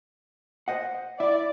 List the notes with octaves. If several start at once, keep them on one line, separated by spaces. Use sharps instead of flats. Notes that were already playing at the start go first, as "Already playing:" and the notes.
C5 D#5 F#5
E4 D5 E5